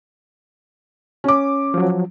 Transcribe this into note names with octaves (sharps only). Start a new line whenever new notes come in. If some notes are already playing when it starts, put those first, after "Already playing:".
C#4 D6
F3 F#3